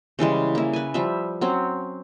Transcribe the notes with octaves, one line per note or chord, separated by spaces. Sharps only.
C#3 E3 G3 G#3
A#3 E4
B4 G#5
F3 G3 E5
F#3 C4 C#4